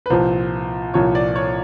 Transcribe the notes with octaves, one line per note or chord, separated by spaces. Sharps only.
B4
C2 A#2 F3 C5
C2 A#2 F3 C#5
D5
C#5